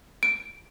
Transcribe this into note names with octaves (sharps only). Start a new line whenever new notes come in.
D7